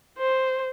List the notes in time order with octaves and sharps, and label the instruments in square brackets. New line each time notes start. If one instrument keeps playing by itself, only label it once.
[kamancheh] C5